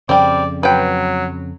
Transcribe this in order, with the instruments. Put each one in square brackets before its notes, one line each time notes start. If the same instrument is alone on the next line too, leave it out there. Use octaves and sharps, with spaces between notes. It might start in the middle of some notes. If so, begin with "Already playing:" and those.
[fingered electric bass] F2 C#3 [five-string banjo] G3 C4 [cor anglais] D5
[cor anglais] F#3 [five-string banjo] B4 G5